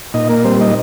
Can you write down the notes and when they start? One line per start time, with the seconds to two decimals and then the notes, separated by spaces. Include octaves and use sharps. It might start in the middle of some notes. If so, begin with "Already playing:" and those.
0.14 A#2 D#4 D#5
0.30 A#3 A#4
0.44 G3 C4 C5
0.60 D#4 D#5